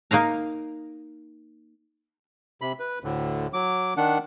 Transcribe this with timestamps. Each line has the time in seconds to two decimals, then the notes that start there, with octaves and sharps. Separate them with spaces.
0.11 A#3 D#4 F5 A#5
2.61 C3 B5
2.79 B4
3.04 D2 A2 D3
3.53 F#3 D6
3.97 D#3 D4 F#5